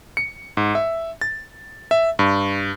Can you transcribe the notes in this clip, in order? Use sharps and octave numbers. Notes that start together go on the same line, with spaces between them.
C#7
G#2
E5
A6
E5
G2